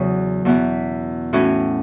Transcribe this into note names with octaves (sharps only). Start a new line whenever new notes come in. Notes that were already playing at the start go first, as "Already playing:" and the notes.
Already playing: E2 C#3 F#3 C#4 F#4
E2 B2 B3 E4
A2 E3 C#4 F#4